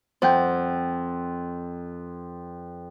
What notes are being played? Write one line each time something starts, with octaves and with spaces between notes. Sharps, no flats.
F2 C5 F#5 G5